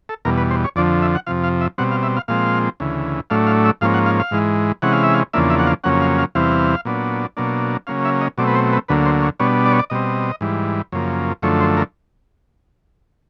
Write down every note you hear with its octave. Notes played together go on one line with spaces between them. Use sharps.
A4
E2 B2 G3 A#4
B4
C5
C#5
F2 D3 F3 D5
E5
F#5
F2 C3 F3 F5
F5
E5
B2 G3 C4 F#5
F5
E5
F5
A#2 F3 G#3 C4 F5
D2 C#3 E3
A2 F#3 A3 D4 F5
F5
E5
G#2 F3 A#3 C#4 F5
F#5
F5
F5
G#2 E3 G#3
C3 E3 G#3 C#4 F#5
F5
E5
F5
E2 C#3 F3 A#3 D4 E5
E5
F#5
F5
F2 C#3 F#3 A#3 C#4 F#5
F5
F5
E2 C3 E3 G3 C4 F5
A#2 F#3 B3 D4
B2 F#3 A#3 D4
C#3 F#3 A#3 C#4 F5
E5
D#5
B2 F#3 A3 C4 D5
B4
C5
B4
D2 D3 F#3 A#3 B4
C5
C#5
B2 G3 B3 D4 C#5
D5
C#5
D5
B2 G3 C4 D#5
G#2 E3 G3
F#2 C#3 F3 A#3
F#2 D3 F3 A3 C#5
C5
A#4